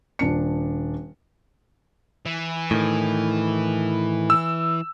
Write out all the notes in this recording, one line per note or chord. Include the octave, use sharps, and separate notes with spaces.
D#1 D4 C#7
E3
A2 D#3
E6